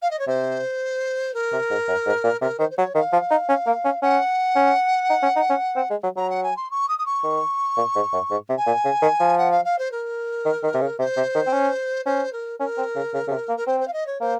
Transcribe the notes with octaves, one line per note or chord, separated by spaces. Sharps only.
F5
D#5
C#5
C3 C5
A#4
C3
G#2
F#2
G#2
A#2
C3 A#4
D#3 C5
C5
F#3 C#5
D#3 F5
F3
D#4
C#4
A#3
C#4
C#4 F#5
C#4
D#4
C#4
D#4
C#4
C4
G#3
F#3
F#3 A#5
F#5
G#5
C6
C#6
D#6
D#6
C#6
D#3
A#2
G#2
F#2
G#2
C3
G#5
A#2
C#3
D#3
F3
F#5
F5
F5
C5
A#4
D#3
D#3
C3
C#3
C3 C5
C3
D#3
C4
C#4
C#4 C5
A#4
C#4 A#4
C4
C#3
C#3
C#3
C3
A#3
A#4
C4 C5
C5
F5
D#5
C#5
A#3 C5